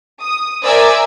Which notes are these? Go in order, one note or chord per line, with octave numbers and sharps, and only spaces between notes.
D#6
A#4 C5 D5 E5 G#5